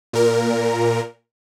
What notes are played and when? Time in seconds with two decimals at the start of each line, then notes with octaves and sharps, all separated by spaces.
0.13 A#2 A#4